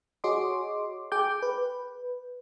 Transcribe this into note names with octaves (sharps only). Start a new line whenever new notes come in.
F#4 G#4 C#5 D#5 C6 D6
G#4 G5 D6 G6
B4